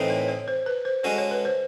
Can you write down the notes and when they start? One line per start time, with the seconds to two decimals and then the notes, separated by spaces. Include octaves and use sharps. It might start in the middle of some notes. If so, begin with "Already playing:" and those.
Already playing: A2 E3 A3 C4 D#4
0.10 C#5
0.28 C#5
0.48 C5
0.66 B4
0.85 C5
1.03 G#3 C#4 F#4 A4 C#5
1.18 C#5
1.31 B4
1.45 C5